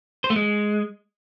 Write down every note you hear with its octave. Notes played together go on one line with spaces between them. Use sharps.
C5
A3
G#3